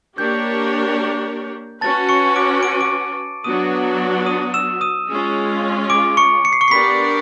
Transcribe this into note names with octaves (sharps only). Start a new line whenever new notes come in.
A#3 D4 G4 A#4 C#5 G6
C#4 F#4 B4 A5 A6
C#6 C#7
D6 D7
D7
D#7
D6 D7
F#3 B3 D4 F#4 D#6 D#7
D#6 D#7
E6 E7
D#6 D#7
G#3 C#4 F4
D6 D7
C#6 C#7
C#7
C7
C#6 C#7
C7
B3 D4 G4 A#4 D5 B5 B6